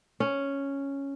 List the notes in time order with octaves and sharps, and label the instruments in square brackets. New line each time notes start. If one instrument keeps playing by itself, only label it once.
[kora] C#4